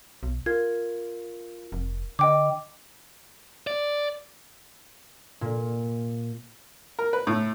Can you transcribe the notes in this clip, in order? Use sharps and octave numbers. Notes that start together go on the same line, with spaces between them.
B1
F4 A#4 G#6
F1
D3 D#5 G5 D6
D5
A#2
A#4
B4
A2